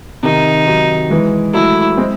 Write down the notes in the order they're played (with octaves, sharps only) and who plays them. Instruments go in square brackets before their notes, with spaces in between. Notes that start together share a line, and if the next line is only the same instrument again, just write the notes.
[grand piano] C3 D#3 [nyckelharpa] D#4
[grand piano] D#3 F#3
E3 G#3
[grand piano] F#3 A3 [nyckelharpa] E4
[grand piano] G#3 C4